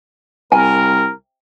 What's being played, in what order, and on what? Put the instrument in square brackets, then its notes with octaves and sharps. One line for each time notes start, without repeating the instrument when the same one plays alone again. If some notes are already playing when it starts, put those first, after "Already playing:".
[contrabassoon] C2 [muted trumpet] A#4 [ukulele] G#5